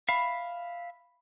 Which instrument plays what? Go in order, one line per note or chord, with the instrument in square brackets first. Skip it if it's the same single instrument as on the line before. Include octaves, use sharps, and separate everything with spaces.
[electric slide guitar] E5 F5 [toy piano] B5